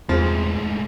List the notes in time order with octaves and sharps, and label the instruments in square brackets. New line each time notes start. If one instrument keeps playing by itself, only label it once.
[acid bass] E2 [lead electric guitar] A2 G#3 [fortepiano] F3 [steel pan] C4 G#4